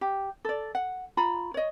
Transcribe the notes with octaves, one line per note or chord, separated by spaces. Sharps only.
G4
A4 D5
F#5
F4 A#5 B5
C#5 D#5